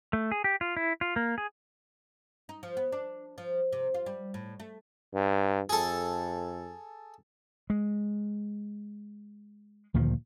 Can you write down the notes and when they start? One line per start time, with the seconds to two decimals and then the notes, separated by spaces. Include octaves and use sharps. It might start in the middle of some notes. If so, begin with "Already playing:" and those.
0.13 A3
0.32 G#4
0.44 G4
0.61 F4
0.77 E4
1.01 F4
1.16 A#3
1.38 G#4
2.49 D#4
2.63 F3
2.77 B3
2.92 D4
3.38 F3
3.72 C3
3.94 F4
4.06 G3
4.34 A2
4.60 A3
5.14 G2
5.69 F2 G#4 A4
7.70 G#3
9.94 D2 A#2 D#3 F3